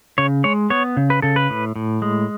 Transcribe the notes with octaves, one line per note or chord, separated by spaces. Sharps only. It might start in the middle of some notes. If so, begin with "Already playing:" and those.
C#3 C#5
G#3 C#5
B3 C#5
C#3
B4
C#3 A4
B4
A2
A2
G#3